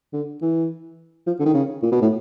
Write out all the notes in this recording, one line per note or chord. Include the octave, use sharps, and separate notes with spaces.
D3
E3
F3
D3
D#3
C#3
A#2
B2
A2